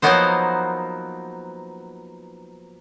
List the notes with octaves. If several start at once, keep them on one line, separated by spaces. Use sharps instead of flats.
F3 F#3 A#3 B3 D#4 C5